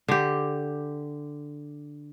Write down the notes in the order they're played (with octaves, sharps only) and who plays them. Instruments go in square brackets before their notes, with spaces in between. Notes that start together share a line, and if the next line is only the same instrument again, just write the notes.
[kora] D3 G4